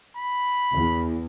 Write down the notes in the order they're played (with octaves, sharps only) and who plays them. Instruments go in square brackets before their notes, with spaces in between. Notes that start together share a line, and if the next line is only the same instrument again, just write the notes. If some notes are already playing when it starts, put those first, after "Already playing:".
[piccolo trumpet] B5
[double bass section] E2